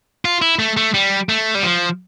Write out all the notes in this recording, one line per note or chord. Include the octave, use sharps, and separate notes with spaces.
F4
E4
A3
A3
G3
A3
G3
F3